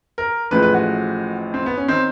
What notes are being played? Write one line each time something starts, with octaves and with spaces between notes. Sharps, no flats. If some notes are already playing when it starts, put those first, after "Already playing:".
A#4
A1 A2 F3 G#3 B4
B4
F#4
C4
B3
C#4
D#3 C4